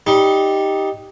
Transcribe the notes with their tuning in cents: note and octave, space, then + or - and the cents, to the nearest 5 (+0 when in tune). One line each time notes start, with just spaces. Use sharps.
G3 +0 D#4 +10